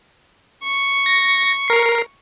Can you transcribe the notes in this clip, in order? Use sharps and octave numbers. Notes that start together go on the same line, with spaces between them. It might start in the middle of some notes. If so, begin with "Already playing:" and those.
C#6
A#6
A#4 C7